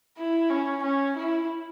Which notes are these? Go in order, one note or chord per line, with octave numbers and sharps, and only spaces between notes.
E4
C#4
C#4
E4